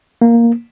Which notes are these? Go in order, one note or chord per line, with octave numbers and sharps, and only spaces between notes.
A#3